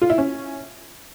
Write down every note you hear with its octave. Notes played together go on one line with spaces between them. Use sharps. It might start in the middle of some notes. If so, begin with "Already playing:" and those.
F4
E4
C#4